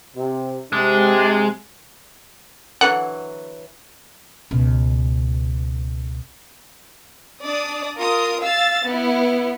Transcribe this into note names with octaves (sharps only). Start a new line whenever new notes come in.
C3
C3 G#3 D4
D3 E3 F#3 F#5
C#2 B2
D4 D5 D#6
F4 A#4 D#6
F5 E6 A6
B3 E4